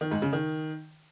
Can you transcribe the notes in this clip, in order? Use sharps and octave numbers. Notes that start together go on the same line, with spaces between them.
D#3
G#2
C#3
D#3